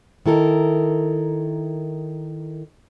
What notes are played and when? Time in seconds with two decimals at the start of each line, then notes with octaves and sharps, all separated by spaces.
0.26 D#3 E4 A4 A#4